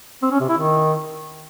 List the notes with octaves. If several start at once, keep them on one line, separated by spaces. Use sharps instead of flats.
C4
C#4
C3
E4
D#3